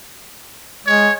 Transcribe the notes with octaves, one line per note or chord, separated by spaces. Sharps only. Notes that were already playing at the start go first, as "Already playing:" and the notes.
G#3 C#5